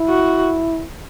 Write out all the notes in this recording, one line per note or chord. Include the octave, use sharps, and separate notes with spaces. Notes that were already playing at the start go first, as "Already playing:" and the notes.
Already playing: E4
F#4